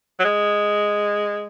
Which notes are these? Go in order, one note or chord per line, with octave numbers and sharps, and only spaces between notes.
F#3
G#3